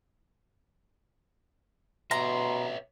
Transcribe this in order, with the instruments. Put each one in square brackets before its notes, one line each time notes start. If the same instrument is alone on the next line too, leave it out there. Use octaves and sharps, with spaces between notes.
[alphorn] B2 [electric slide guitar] B4 C#5 E5 [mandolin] A#5 [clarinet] C6